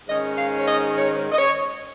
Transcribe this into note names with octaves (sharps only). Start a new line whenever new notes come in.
G#2 D#3 G#3 C#4 D#5
F5
C#5
D#5
C#5
D#5
C#5